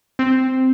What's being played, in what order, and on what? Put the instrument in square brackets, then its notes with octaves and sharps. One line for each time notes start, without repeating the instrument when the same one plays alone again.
[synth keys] C4